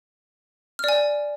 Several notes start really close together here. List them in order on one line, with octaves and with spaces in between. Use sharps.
F6 D5 G#5